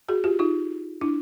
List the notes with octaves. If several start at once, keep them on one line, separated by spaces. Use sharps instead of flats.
F#4 G#4
F4 G4
D#4 F4
D4 E4